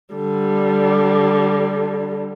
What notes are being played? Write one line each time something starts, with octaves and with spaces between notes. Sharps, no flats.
D3 G3